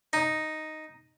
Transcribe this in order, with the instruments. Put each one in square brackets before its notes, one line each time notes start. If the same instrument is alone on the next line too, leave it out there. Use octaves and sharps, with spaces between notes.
[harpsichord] D#4